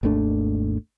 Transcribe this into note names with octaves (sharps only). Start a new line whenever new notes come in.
G#1 D#2 A3 D4